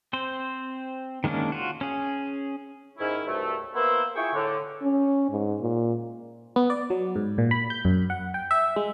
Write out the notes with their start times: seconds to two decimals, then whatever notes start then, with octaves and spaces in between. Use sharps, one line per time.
0.13 C4 C5
1.24 D#3 G#3 A#3 C#4 D4
1.52 F4 F#4
1.81 C#4 G#4
2.98 G#2 D#3 C#4 E4
3.26 C2 G2 C3 F#3 A3
3.75 A#3 B3 E4 C5
4.16 E4 F4 G#4 E5 G5 C#6
4.34 A2 D3
4.82 C#4
5.30 G#2
5.61 A#2
6.56 B3
6.70 D5
6.90 F#3
7.16 G#2
7.38 A#2
7.51 B5
7.70 G6
7.85 F#2
8.10 F#5
8.34 G5
8.51 E5
8.76 G#3